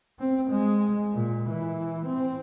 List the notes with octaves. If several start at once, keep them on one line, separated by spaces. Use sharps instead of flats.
C4
G#3
A#2
E3
C4